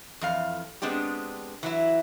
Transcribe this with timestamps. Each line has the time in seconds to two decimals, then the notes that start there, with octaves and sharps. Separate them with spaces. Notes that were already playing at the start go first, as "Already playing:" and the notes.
0.21 F2 E3 F5
0.82 G#3 B3 C4 D4 G4
1.63 E3 F#3 E4